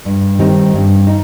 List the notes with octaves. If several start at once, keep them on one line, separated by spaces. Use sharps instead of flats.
G2
D#3 G3 C4 D#4
G2
D#4